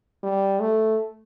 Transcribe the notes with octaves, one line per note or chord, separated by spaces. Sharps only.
G3
A3